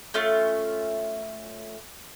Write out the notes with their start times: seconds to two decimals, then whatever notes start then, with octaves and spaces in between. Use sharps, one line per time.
0.14 A3 C#4 F4